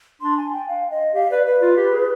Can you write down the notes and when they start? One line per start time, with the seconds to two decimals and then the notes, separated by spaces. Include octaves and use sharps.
0.21 D4 C6
0.37 G#5
0.53 G5
0.68 F5
0.91 D#5
1.14 G4 F5
1.31 B4 D5
1.45 B4
1.61 F4
1.77 G4
1.92 G#4